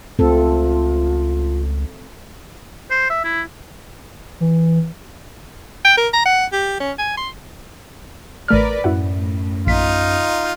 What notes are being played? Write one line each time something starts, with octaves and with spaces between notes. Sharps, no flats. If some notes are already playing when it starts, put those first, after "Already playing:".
C#2 A3 C4 F4 A4
C5
E5
E4
E3
G5
A#4
A#5
F#5
G4
C#4
G#5
C6
A1 A3 A#4 B4 D5 F6
F#2 A2 E4 F#4 F#5
A#1 D#4 F4 B6